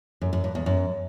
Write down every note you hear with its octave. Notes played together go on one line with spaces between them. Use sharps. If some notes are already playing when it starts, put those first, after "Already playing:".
F#2
F#2
G2
E2
F#2